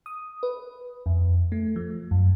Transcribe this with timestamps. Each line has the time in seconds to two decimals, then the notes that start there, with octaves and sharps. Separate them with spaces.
0.06 D#6
0.43 B4
1.06 F2
1.52 A3
1.76 F3
2.11 F#2